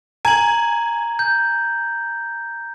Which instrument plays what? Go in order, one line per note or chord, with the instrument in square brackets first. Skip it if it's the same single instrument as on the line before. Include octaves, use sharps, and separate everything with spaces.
[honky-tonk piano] G#5 [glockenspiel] A#5 G#6 F#7
[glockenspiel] G6